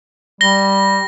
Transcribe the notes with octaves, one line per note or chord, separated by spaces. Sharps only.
G3 A#6 G7